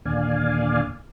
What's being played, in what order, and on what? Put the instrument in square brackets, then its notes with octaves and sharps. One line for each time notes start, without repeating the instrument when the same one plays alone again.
[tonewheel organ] D#2 A#2 D3 D5 F5 G#5